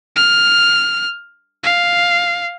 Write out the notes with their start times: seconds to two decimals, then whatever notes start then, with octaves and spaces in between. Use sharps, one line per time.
0.16 F6
1.64 F5